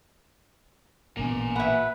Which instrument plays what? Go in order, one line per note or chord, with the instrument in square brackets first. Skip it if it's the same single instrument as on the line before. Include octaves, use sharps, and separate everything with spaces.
[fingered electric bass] A1 A#2 B3 [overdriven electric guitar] A#3 G#5
[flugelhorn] B4 [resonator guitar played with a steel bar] E5 F#5